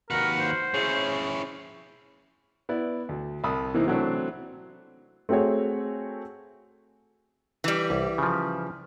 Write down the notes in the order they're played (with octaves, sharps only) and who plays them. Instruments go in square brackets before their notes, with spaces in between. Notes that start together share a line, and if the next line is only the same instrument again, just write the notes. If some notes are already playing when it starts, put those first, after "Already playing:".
[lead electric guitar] D#2 B4 [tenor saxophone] F#4 [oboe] A#4
[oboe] C5
[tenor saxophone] C#3 [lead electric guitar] C#4 E4
[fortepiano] B3 E4 D5
D2
C2 A5 B5 D#6 E6
C3 E3 A#3 C4 D#4
C3 E3 F#3 A3 C4 D4
[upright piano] A3 C4 F#4 G#4 C#5
[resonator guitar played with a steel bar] E3 G3
[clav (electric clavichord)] C2
C#3 F3